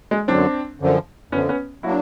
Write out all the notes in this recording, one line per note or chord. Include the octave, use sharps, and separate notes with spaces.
G#3
F#2 D3 F#3 C4 D4
F#2 D3 F3
F#2 D3 F3 B3 C#4
B3 C#4
F#3 A#3 D4 E4 F#4